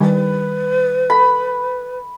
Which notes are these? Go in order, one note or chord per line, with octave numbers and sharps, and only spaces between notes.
D#3 G3 B4
A4 B5